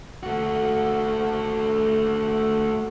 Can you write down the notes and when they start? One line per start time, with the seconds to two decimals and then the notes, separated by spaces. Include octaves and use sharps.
0.23 A3 F#4